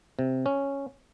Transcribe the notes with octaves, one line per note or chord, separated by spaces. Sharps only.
C3
C#4